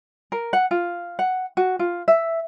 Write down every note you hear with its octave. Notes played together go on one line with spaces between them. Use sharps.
A#4
F#5
F4
F#5
F#4
F4
E5